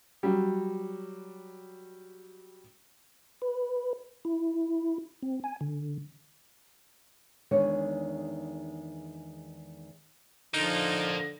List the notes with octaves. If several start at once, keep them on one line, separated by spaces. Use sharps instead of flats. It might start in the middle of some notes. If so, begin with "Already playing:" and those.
F#3 G3
B4
E4
C4
G#5
D3
E2 D#3 G#3 D4 G#4 C#5
D3 F3 A#3 D#4 F4